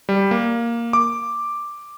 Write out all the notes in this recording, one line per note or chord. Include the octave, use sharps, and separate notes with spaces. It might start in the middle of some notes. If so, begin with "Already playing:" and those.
G3
A#3
D6